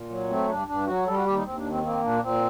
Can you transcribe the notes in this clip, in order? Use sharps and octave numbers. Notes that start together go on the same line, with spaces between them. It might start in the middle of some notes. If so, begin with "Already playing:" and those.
Already playing: A#2
F#3
A3 C4
G2 D4
G2 D4
F#3 F#4
G3 A4
F#4
D#2 G4
D#4
D#2 C4
D4
D#3
C4
A#3 C4
A#2 D4
A#2 C4